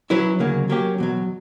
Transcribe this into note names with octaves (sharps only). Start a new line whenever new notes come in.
F#3 C#4 E4 B4
D2 C#3 F#3 A#3
F#3 A#3 C#4 G4
E2 B2 F#3